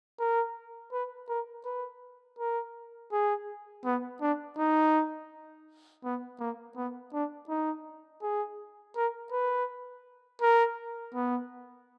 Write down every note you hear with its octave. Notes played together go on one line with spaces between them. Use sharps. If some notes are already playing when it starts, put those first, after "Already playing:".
A#4
B4
A#4
B4
A#4
G#4
B3
D4
D#4
B3
A#3
B3
D4
D#4
G#4
A#4
B4
A#4
B3